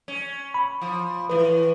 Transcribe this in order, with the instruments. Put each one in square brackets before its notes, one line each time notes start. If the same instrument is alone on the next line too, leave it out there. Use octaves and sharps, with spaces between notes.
[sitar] C#4
[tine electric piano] B5
[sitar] F3
[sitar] A2 E3 [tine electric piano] B4